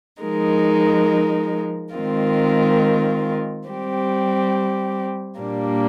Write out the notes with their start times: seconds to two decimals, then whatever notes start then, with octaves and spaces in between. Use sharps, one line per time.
0.22 F3 G#3 D#4 A#4
1.94 D#3 G#3 C4 F4 A#4
3.67 G3 C4 G4
5.39 A#2 G3 A#3 D4